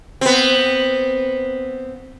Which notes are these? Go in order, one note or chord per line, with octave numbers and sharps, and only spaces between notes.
B3 C4